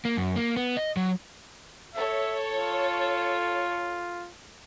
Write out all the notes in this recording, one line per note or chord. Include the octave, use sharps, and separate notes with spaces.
A#3
F#2
A#3
B3
D#5
F#3
A4 C#5 E5
F4